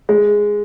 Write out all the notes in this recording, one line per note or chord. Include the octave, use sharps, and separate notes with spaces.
G#3